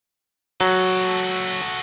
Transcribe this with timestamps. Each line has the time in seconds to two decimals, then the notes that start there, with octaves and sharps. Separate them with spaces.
0.61 F#3 F#4 A4